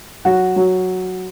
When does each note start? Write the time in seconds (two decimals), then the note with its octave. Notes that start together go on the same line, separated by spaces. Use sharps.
0.25 F#3 F#4
0.56 F#3